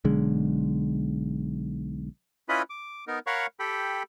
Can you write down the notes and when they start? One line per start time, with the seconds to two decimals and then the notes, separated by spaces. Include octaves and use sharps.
0.05 B1 D3 G#3
2.49 C#4 E4 F4 B4 D#5 B5
2.70 D6
3.07 B3 D#4 A#4
3.27 A#4 C#5 F5 F#5 B5 C#6
3.59 G4 A4 G5 B5